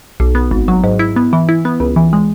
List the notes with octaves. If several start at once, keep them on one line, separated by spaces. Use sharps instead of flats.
B1
B3
G#1
F#3
G#2
E4
B3
E3
E4
B3
C#2
E3
G#3